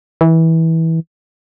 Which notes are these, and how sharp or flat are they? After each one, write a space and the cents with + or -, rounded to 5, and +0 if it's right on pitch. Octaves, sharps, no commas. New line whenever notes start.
E3 -20